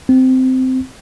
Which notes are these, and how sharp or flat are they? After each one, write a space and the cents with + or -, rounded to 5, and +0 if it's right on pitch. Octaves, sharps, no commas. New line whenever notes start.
C4 -15